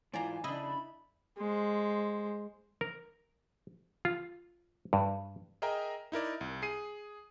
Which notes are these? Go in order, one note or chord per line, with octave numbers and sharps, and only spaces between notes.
G#2 E3 F4 D5 G#5 A#5
C#3 D4 E4 D#5 B5
G#3 C5
A#4
F4
G2
G#4 A#4 D#5 E5 G5 A#5
D#4 E4 A#4 D5
C2
G#4 C7 D#7